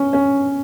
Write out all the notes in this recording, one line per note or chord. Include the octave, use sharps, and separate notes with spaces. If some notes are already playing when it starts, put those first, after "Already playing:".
Already playing: C#4
C#4